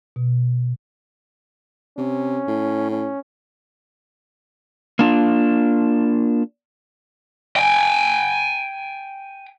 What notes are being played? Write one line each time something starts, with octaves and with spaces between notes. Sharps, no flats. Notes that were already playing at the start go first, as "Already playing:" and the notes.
B2
C3 C#4
A2
C#4
A#3 D4 F4
G5 G#5